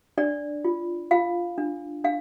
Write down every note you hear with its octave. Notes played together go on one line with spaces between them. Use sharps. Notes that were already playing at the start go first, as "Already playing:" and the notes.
D4 D5
F4
F4 F5
D4
D4 F5